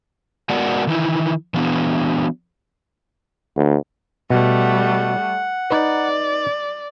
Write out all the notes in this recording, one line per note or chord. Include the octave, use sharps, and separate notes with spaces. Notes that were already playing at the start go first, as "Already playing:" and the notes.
G#3 B3 F#4 A#4 D5 F#5
D#3 E3 D#4 E4
E3 F#3 B3 D4
D2
B2 G3 A3 F#5
D#4 B4 D5